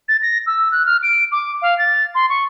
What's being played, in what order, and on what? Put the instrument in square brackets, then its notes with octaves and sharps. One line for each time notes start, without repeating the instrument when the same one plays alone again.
[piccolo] A6
A#6
E6
F#6
F6
D7
D6
F5
A6
C6
C#6